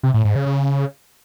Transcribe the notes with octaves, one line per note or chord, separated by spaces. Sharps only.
C3
A2
G#2
C#3
C#3